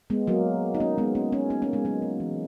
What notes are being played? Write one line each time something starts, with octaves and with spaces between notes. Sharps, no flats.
G#3 B3
F#3 A#3
D#4
A#3 C#4
G#3 B3
A#3 C#4
A#3 C#4
B3 D#4
A#3 C#4
G#3 B3
F#3 A#3
F#3
E3